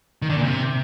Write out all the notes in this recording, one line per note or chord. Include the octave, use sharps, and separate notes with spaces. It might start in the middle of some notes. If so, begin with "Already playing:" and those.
D#3
D3
A#2
C3